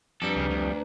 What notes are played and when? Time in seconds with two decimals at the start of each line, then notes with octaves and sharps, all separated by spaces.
0.22 F2 G3 D4 A4 B4 A#5
0.36 C#2 C#3
0.50 D2